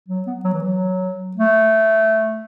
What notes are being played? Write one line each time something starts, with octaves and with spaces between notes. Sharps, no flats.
F#3
B3
F#3
E3
F#3
A3